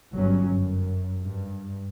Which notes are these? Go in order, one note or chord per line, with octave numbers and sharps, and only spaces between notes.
G1 G2 F#3 C#4
F#2
G2